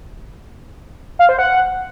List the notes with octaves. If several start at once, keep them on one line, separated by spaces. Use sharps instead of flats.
F5
C5
F#5